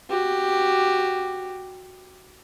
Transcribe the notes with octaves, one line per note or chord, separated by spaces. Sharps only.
F#4 G4